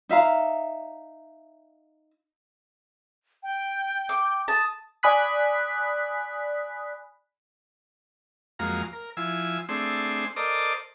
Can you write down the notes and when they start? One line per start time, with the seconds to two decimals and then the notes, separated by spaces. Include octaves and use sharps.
0.09 D#4 E5 F5 A#5
3.43 G5
4.09 D6
4.48 A5 D#6
5.03 D5 G#5 B5 D#6 F#6 B6
8.59 F2 F#3 G#3 A#3 F5 A#5
8.93 A#4
9.17 F3 E4 G#5 E6
9.69 A3 C4 D4 G#4 C6 E6
10.36 A4 A#4 C5 D5 D#5 D6